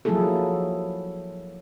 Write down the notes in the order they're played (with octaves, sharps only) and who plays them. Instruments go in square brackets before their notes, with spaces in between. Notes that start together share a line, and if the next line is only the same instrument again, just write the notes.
[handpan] F3 F#3 A#3 E4 G#4 A4